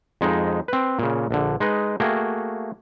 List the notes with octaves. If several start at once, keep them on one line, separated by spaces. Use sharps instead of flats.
F2 G#3 D#4
C4 B4
A#2 C#3
A#1 D3
G#3 D#4 B4
A3 A#3 F#4 G#4 G5